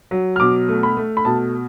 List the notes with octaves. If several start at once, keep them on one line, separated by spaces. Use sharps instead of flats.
F#3
F6
B2 D6
A3
B5
A3
B5
B2 A5